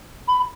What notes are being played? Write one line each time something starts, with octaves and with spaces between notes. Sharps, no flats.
B5